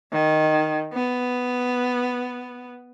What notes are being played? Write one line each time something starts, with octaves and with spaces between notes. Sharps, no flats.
D#3
B3